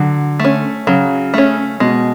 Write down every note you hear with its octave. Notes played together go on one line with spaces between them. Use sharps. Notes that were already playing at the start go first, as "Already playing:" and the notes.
Already playing: D3 F#3
A3 C#4
C#3 F#3
A3 C#4
B2 G#3